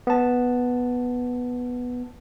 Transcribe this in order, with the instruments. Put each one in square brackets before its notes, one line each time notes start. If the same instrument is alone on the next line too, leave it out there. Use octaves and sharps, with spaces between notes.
[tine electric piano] B3 A5